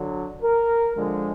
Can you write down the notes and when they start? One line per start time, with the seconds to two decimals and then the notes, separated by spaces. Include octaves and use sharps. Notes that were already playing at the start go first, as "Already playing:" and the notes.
Already playing: D3 F#3
0.42 A#4
0.96 D3 F3 G#3